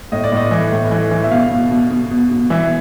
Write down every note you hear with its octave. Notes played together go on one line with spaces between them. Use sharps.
A2 D#5
D5
A2 D#5
E3
A2
E3
E3
E5
B2 F5
B2
B2
B2
B2
B2
E3 E5